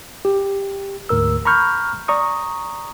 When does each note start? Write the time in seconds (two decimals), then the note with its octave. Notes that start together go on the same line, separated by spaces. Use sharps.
0.25 G4
1.09 D2 G#2 A#4 E6
1.45 A#5 B5 C#6 F6 G6
2.08 D5 A#5 C#6 D#6